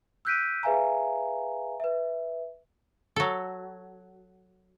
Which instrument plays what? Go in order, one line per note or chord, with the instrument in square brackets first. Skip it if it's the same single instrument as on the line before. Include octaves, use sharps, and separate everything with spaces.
[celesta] E6 F#6 G6 B6 D7 D#7
G#4 B4 E5 F5 G#5 A#5
B4 E5
[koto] F#3 A4